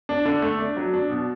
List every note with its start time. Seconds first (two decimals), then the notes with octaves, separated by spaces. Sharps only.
0.09 D4
0.25 D3
0.42 A3
0.59 D4
0.77 F#3
0.93 D4
1.10 B2